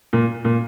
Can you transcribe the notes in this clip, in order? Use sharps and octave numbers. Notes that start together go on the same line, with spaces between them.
A#2
A#2